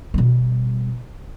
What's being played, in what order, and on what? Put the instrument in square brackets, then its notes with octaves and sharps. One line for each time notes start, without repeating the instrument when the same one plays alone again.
[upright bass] B2 G3